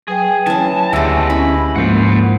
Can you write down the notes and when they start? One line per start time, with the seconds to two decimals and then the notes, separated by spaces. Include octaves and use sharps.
0.08 F#3 G#4 B4 G5
0.46 E3 C#4 A5
0.93 D2 G#3 B3 D4 G4 E5 E6 A#6
1.30 C#4 E4 B5
1.76 G#2 F3 A#3 C5 F#5